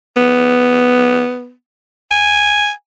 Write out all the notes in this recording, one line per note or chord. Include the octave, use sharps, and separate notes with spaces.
B3
G#5